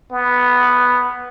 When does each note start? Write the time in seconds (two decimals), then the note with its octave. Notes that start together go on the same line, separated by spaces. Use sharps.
0.12 B3